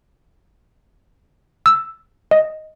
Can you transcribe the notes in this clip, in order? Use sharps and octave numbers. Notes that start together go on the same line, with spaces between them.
E6
D#5